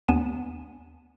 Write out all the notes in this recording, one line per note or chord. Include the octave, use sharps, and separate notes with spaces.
D#2 B3 D4 G#5 D#7 E7